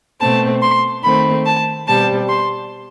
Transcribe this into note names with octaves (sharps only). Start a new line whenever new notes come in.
B2 A3 C4 A5
C6
D#3 A3 C4 B5
A5
B2 G3 C4 A5
C6